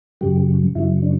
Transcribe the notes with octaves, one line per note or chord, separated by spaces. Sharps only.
F#2 C#3 F#3 G4
F#2 C#3 F#3 E4
D4